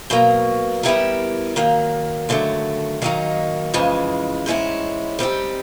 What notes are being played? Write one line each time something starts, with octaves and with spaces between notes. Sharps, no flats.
B2 F#3 A#3
G3 B3 E4 G4 A#4
D#3 F#3 A#3
D#2 D3 F#3 A3
D#3 F#3 A#3 D#4
F2 C#3 E3 G#3
G#2 E3 G#3 C#4 E4
G3 C4 D#4 G4